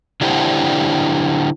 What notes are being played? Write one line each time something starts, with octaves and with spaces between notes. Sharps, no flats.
D3 D4 E4 G4 C5 F#5